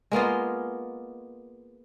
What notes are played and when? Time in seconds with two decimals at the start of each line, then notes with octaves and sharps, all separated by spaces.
0.12 G#3 A#3 B3 F4